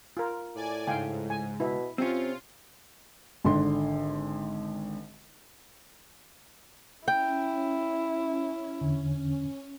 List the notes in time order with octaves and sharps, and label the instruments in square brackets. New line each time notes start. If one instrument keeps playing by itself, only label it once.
[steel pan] F4 A#4
[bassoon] A2 [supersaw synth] D5 G#5
[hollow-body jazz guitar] C#2 [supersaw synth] G#2 [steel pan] F5 G5 G#5
[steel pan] G#5
[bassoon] B2 [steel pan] E4
[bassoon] C3 [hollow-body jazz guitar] C4 C#4 [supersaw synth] F4
[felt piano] G#1 D3 C6
[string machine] C#4 [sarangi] E4 [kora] G5
[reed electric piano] E2 D3